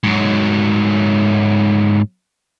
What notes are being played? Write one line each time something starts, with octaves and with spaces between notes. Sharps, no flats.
G#2 F#3